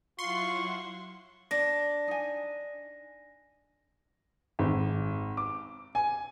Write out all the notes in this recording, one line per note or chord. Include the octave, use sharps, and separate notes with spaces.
F#3 E4 F4 F#5 C6 C#6
D4 D5 A#6
D#4 G#5
G#1
D6
G#5